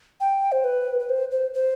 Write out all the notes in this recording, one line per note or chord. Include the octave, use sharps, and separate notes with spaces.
G5
C5
B4
B4
C5
C5
C5